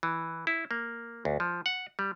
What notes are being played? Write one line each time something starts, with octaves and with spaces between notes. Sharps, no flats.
E3
E4
A#3
D2
F3
F#5
G3